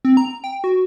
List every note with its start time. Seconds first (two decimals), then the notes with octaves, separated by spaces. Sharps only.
0.05 C4
0.17 A#5
0.44 G5
0.64 F#4